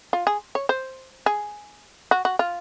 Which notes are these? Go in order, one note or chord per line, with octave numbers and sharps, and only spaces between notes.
F4
G#4
C#5
C5
G#4
F#4
F#4
F4